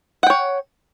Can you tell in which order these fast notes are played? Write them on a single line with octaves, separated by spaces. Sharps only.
F#5 G5 C#5